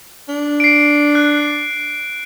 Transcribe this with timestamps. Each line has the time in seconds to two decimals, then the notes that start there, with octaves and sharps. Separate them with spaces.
0.29 D4
0.60 C7 D7
1.15 F#6